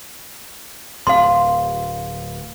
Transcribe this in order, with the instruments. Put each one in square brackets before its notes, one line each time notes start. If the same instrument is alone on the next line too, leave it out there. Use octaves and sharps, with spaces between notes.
[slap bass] D1 [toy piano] F5 C6